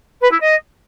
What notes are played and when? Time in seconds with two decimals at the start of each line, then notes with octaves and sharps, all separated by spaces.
0.22 B4
0.31 E4
0.40 D#5